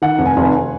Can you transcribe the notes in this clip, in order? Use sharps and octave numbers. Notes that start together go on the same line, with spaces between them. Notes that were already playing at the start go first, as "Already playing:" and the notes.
D#3 F#5
F1
G#5
F1